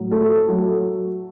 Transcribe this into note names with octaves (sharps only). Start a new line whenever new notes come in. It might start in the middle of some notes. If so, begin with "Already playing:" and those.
Already playing: A2 F#3
A3 A4
F#3 A3